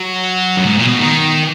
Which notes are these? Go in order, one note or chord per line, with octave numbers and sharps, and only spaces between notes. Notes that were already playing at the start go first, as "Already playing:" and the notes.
Already playing: F#3
F#2
G#2
A#2
B2
D#3